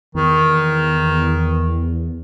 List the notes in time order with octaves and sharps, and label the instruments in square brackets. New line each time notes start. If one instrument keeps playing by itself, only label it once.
[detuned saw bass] E2 [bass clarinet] D#3